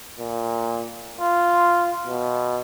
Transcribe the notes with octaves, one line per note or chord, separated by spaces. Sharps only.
A#2
F4
B2